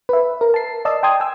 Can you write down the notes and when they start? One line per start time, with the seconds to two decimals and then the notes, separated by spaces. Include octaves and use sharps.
0.09 B4 E5
0.41 A#4
0.54 A5 C7
0.85 D5 D#5 A5 E6
1.03 G5 A5 C6 D#6 G#6
1.20 G5 G#5 E6